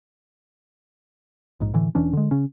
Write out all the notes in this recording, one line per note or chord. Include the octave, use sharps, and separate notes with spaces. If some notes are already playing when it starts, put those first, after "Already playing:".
A#1 G#2
A2 D3 E3
E1 E3 C#4 D4
D3 G#3
C#3 C#4